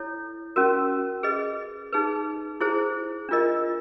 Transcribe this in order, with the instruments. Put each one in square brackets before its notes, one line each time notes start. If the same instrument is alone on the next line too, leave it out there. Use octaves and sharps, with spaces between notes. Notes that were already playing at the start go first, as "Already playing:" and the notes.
Already playing: [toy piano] E4 A4 C#5
C#4 F#4 A#4
G#4 B4 D#5
D#4 G#4 B4
E4 G#4 C5
D4 F4 A#4 D#5